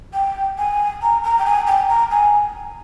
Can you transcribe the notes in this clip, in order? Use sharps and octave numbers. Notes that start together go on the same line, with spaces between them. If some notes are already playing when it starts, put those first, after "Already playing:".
G5
G#5
A#5
A#5
G5
G#5
G5
A#5
G#5